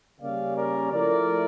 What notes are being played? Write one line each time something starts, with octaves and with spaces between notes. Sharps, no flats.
C#3 G3 A#3 C#4 D5 F5
A#4 D5
F3 A3 E4 A#4 D5